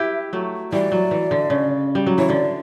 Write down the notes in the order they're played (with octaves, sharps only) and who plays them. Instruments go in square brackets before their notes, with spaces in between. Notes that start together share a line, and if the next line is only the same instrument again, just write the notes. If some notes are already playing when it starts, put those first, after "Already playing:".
Already playing: [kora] E4 G4 B4 [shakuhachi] E5
[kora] F#3 A3
[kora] E3 G3 [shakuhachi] D5
[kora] F#3
E3
D3
C#3
G3
F#3
[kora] E3 [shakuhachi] C#5
[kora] D3 [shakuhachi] D5